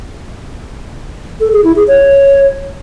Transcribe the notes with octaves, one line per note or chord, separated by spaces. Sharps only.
A4
G#4
E4
G#4
C#5